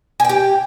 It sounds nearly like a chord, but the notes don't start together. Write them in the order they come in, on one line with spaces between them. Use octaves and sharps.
G#5 G5 G4